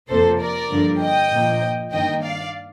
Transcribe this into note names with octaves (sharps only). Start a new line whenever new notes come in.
F2 C3 F3 A#3 A4 C5
A#4 D5
G2 D3 F3 A#3
D#5 G5
A#2 F3 A#3
G2 D#3 A#3 D#5 G5
D5 F5